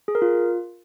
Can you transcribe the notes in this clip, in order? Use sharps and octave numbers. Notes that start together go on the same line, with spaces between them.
G#4
A#4
F4